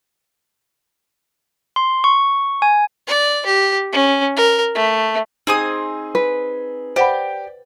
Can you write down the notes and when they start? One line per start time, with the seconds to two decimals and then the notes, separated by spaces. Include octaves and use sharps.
1.76 C6
2.04 C#6
2.62 G#5
3.07 D5
3.46 G4
3.92 C#4
4.36 A#4
4.75 A3
5.47 C4 D#4 G#4 G#5 D#6
6.15 B4
6.96 G4 C5 D5 F#5 G5 B5